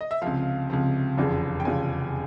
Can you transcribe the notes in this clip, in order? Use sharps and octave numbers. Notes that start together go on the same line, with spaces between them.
D#5
E5
C#2 C3 F3 F5
C#2 C3 F3
F1 E2 C#3 F3
G5
F1 E2 C#3 F3 G#5